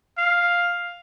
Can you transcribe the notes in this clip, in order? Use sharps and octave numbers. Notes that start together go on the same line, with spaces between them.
F5